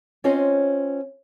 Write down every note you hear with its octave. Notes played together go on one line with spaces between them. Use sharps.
C4 C#4 F4 C5 C#5 D#5